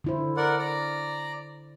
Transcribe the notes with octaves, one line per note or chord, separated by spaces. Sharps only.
D3 E4 C5
A#4 D5 F#5
D5 A#5